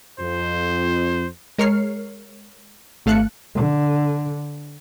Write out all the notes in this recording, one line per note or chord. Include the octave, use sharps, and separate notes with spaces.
F2 C5
G#3 A#4 C#5 F6 C7 C#7
G#1 A3 F5 A5 F#6 C#7
D3